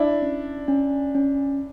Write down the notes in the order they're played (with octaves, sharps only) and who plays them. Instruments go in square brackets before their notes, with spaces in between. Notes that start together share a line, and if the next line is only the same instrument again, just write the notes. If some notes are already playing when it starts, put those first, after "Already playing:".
Already playing: [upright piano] D4 E4
[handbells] C#4
C#4
C#4